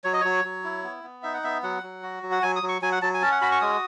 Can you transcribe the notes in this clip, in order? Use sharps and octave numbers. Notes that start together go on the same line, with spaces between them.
F#3 C#5
D#5
F#3 C#5
F#3
E4
B3
B3
D#4 E5
F#5
B3 E5
F#3 F#5
F#3
F#4
F#3
F#5
F#3 G#5
D#6
F#3
C#6
F#3 G#5
F#5
F#3 A5
G#5
C#4 A5
F#5
F#4 B5
C#6
G#3 D#6